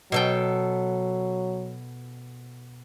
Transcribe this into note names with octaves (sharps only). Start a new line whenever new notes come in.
B2 F#3 A4 G5